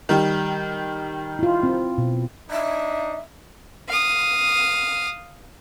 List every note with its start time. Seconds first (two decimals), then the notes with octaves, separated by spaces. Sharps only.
0.09 D#3 G3 G4
1.39 E4 F4
1.63 C4
1.98 B2
2.51 D4 D#4 E5
3.89 F5 D#6